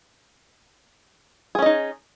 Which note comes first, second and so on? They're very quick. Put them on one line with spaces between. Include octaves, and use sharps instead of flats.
G#4 C#4 D#5 D#4